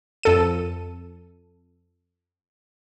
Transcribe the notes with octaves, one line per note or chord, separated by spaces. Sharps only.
F2 A4 D#7